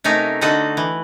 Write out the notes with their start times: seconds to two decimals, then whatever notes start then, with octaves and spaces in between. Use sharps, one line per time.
0.04 C3 A3 C#4 D#4 A#4
0.41 D3 D#4 F#4 A4 D#5
0.77 E3